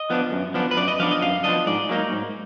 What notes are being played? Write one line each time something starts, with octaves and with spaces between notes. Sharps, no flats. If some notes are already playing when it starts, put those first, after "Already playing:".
Already playing: D#5
F3 B3 D4
F#2
F3 B3 D4
B4
F#2 D5
D#5
F3 B3 D4 F5
D#5
F#2 F5
F3 B3 D4 D#5
G#2 D5
F#3 A#3 D#4
G#2